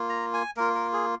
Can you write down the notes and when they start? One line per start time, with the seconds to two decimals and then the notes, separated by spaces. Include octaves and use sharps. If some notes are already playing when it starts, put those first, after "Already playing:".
Already playing: A#3 F4
0.09 A#5
0.34 G#5
0.57 A#3 F4 A#4
0.75 A#4
0.93 G#4